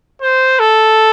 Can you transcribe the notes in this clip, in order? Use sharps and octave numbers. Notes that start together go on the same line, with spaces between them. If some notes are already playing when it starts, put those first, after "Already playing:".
C5
A4